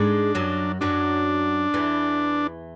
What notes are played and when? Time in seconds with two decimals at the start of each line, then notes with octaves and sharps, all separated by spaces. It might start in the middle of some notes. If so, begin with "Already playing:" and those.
Already playing: G#2 G#3 D4
0.35 F#2 F#3
0.81 F#2 F#3 D4
1.74 E2 E3